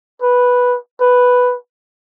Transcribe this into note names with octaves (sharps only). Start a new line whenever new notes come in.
B4
B4